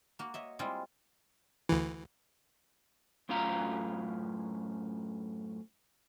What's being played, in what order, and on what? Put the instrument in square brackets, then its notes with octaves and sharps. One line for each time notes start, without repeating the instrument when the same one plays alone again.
[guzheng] A#3 F#4
C#5 D#5 E5
G3 G#3 C4 E4 F4 G#4
[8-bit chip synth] D2 E3
[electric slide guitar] F#2 A2 C#4 F4 F5 A#5